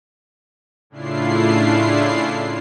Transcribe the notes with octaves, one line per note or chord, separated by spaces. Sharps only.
A2 C#3 D4 E4 F4 C7